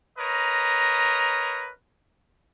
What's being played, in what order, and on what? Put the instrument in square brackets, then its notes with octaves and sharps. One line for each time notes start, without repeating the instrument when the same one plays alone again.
[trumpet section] A#4 B4 C#5 D#5 A#5